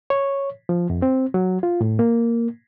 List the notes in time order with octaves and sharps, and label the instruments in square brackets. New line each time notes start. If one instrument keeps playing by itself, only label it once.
[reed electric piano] C#5
F3
F2
C4
F#3
F4
A2
A#3